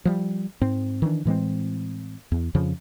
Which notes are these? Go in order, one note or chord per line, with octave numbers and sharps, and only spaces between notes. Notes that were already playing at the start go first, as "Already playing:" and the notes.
F3 G3
G#2 C4
D#3 E3 D4
A2 E3 G#3 C4
E2
F2 C#3 F3